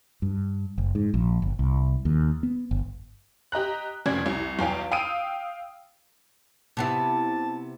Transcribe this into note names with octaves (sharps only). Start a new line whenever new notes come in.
G2
F#1
G#2
A#1
G1
C2
D#2
B3
G1
G4 D#5 A#5 F#6
F1 F2 C#3 D5 G#6
C2
B1 E2 F5 G5
F5 G5 D#6 E6 D7 D#7
C3 B3 E4 A5